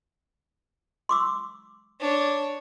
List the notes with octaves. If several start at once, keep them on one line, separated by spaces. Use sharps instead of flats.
C6 D6 E6
D4 C#5